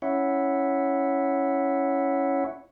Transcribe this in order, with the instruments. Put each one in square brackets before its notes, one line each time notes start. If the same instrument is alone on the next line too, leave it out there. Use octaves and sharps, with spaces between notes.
[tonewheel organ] C#4 E4 C#5 E5 F#5